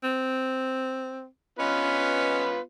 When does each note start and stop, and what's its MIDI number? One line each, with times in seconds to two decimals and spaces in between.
0.04 1.26 60
1.59 2.59 59
1.59 2.52 61
1.59 2.59 65
1.59 2.59 71
1.59 2.49 75